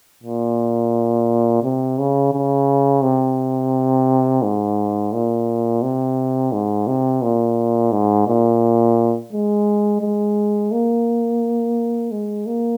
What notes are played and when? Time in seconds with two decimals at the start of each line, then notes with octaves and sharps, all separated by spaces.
0.23 A#2
1.63 C3
1.98 C#3
2.33 C#3
3.03 C3
4.42 G#2
5.12 A#2
5.82 C3
6.52 G#2
6.87 C3
7.22 A#2
7.92 G#2
8.27 A#2
9.32 G#3
10.01 G#3
10.71 A#3
12.11 G#3
12.46 A#3